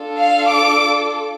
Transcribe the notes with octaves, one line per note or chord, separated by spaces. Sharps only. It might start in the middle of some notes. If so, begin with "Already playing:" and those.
Already playing: D4 F4 A4
F5
D6